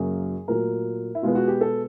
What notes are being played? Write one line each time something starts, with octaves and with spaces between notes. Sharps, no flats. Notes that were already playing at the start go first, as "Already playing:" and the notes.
Already playing: F#2 C#3 F#3 A#3 G#4
A#2 F#3 A3 A#4
E4
B2 G#3 B3 F4
F#4
G4
A4